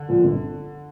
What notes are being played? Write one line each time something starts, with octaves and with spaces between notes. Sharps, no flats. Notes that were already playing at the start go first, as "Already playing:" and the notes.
Already playing: D3
A#2 F3
G1